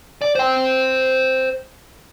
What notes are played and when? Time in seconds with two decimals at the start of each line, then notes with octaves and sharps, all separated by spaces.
0.22 D5
0.35 C5 G5